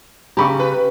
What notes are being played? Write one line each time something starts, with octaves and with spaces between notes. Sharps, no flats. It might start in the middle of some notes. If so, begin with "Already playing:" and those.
C#3 G4 A#5 B5 C#6
B4